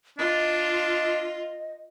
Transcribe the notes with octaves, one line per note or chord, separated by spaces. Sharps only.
D4 F4 D#5